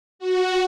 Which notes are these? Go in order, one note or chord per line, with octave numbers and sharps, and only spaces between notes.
F#4